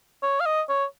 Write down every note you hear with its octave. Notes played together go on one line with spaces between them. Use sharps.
C#5
F5
D#5
C#5